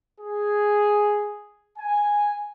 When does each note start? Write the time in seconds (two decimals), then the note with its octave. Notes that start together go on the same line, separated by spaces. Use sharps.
0.20 G#4
1.78 G#5